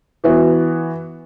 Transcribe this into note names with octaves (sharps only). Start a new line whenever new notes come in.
E3 B3 F#4